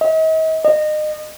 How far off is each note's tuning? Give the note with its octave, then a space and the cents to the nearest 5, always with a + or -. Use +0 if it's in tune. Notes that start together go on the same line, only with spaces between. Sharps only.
D#5 +40
D#5 -30